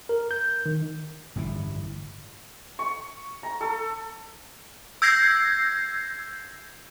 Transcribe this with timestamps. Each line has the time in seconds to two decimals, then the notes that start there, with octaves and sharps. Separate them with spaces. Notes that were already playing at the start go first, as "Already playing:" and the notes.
0.09 A#4
0.31 G6
0.66 D#3
1.36 G1 A2 E3
2.79 C#6
3.43 A#5
3.61 A4
5.02 E6 G6 G#6 A#6 C7